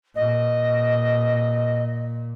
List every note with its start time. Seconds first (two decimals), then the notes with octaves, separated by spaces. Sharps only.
0.15 A#2 D#5